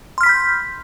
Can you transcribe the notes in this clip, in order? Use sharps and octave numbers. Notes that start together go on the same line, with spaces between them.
B5 C6 F6 G6 B6